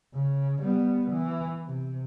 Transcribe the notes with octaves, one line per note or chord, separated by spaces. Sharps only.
C#3
G3 B3
E3
C3